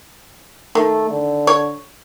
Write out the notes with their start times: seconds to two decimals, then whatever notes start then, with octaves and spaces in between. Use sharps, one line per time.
0.75 D#3 A3
1.10 D3
1.47 C#5